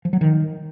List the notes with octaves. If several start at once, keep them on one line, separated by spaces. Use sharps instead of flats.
F3
F#3
D#3